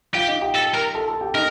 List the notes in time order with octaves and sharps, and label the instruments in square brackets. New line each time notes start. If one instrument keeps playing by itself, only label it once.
[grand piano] F4 F5 [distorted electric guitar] G4
[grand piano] D#4 D#5
G4 G5
[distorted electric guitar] A4
A#4
[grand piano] A4 A5
A4 A5
G4 G5
[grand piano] D#4 D#5 [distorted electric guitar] A#4